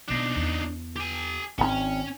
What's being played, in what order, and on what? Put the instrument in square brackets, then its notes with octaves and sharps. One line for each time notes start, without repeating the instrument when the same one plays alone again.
[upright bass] B2 B3 [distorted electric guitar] D4 D#4
[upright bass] E2
[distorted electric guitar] G4 G#5
[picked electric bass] G#1 B2 C4 [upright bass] G#2 [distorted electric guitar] C#4